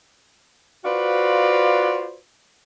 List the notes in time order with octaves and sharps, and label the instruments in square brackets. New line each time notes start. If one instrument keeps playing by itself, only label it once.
[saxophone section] F4 F#4 B4 C5 D5 F5